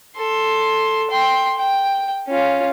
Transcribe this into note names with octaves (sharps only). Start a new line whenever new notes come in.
A4 C6
G5 C6
G5
C#4 F4